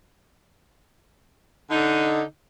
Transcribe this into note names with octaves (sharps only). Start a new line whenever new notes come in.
D3 D#4